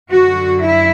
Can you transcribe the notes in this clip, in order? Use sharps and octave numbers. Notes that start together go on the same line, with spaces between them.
F#2 D3 F#4
E4